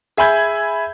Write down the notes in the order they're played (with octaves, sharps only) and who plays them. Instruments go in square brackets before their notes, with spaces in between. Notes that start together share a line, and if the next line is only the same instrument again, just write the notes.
[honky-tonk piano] G#4 E5 G#5 B5 G6 G#6